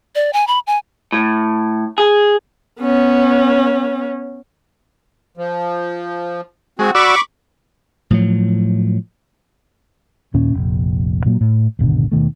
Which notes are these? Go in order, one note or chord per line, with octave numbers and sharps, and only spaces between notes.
D5
G#5
B5
G#5
A2
G#4
B3 C#4
F3
G#3 C4 F#4
F#4 D5 B5 C#6 D6 E6
A2 F3 F#3
D#2 A#2 C#4
F1 A#1
A#2 F#3 A3 A#3
A2
D#1 G#1 B2 D3
D#2 B2 D#3 A3